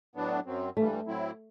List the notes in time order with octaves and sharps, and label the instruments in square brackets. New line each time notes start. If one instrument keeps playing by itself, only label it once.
[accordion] A2 F#3 B3 D4
F#2 F#3 C4
[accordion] G2 E3 G3 [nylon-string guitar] A3
[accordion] A2 F#3 C4 E4